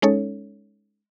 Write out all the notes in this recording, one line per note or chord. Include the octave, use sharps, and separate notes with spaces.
G#3 C#4 D#4 A4 C#5